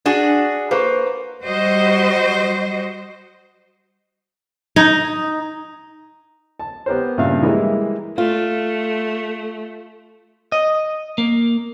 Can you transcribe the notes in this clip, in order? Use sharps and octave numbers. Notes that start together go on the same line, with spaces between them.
D4 F#4 G#4
A#3 B4 C5 C#6
G3 F#4 C5 D#5
D#4
A5
B3 G4 A#4 C5
G2 A#2 C#3 E5 F5
E3 G3 G#3 A#3 E4 G#4
A3 F4
D#5
A#3